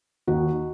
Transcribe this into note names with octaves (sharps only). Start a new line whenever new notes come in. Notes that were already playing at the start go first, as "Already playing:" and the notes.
D#2 D#3 D#4 F#4